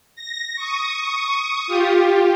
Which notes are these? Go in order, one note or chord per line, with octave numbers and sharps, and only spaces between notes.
A#6
C#6 D#6
F4 G4